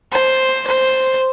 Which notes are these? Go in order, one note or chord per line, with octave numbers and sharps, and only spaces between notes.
C5
C5